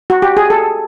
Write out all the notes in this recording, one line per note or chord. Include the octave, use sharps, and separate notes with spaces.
F#4
G4
G#4
A4